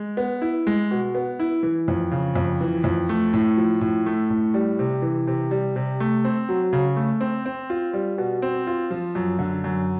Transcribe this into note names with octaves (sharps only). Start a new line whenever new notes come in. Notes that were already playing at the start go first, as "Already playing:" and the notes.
Already playing: G#3
B3
E4
G#3
B2
B3
E4
E3
F2
C#3
F2
E3
F2
A3
A2
F3
A2
A3
A2
G3
C3
E3
C3
G3
C3
A3
C4
F#3
C#3
A3
C4
C4
F4
G3
B2
C4
F4
F3
F#2
D3
F#2